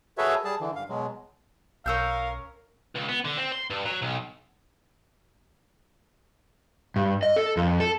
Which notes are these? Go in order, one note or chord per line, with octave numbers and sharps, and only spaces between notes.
F#4 G#4 A4 B4 C#5 E5
G3 G#4 A5
D3 E3
G2 F5
B2 F#3 G#3
B1 C#4 A#4 F5 E6 G6
C#2
B3
D3
C4
C6
G2
F#3
B1
G2
D#5
A4
F2
A4